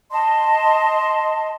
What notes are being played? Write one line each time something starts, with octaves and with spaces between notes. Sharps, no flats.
D#5 A5 C6